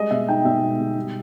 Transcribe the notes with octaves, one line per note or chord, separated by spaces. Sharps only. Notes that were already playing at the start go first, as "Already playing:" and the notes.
Already playing: G3 G#3 D#5
B2 E5
D#4 G5
B2 E5
G#3
B2
G3